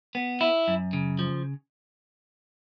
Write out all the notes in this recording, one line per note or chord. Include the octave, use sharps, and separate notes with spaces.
B3
E4
F#2
C#3
F3